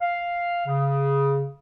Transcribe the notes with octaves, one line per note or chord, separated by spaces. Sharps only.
F5
C#3